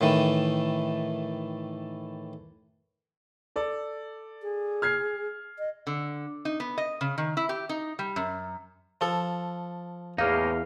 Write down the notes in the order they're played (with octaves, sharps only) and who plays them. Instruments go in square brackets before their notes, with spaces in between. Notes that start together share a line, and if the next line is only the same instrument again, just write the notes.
[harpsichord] A2 D#3 E3 A3
[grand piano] A4 D5
[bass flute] G#4
[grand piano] F6 G#6 C7
[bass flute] D#5
[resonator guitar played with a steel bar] D3
D#4
B3
D#5
C#3
D#3
E4
G4
D#4
G3
F#2
[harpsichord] F3 A4
[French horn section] E2 [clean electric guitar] A2 A#3 D#4 [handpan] F5